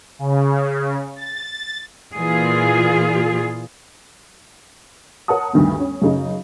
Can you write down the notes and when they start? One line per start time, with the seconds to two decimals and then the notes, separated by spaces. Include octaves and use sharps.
0.19 C#3
1.16 A6
2.15 A#2 E3 F4 G#4
5.28 A#4 C#5 F#5 A5 D#6
5.53 D2 G2 D#3 B3
5.80 C#4
6.02 F#2 C#3 D#4